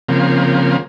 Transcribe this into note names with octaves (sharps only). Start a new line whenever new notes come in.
C#3 F3 A#3 C4